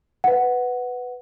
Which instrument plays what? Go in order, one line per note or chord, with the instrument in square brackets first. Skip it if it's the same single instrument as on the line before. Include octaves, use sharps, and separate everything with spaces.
[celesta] B4 F#5